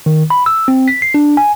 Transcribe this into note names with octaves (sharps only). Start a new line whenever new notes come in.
D#3
B5
E6
C4
B6
C7
D4
G#5